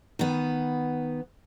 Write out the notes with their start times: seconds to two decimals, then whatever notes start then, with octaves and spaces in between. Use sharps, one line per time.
0.19 D#3 B3